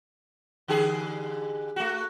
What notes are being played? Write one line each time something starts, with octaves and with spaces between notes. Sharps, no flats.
D3 G4 G#4
A3 F#4